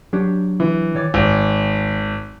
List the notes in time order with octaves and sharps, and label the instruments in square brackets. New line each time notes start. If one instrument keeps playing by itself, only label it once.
[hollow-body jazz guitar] F#3 D4 G4
[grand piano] E3
[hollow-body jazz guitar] D#3 C#5 D5
[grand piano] G#1